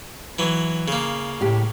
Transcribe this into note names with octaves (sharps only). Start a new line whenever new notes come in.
E3 F#3
C#3 A#3
A2 G4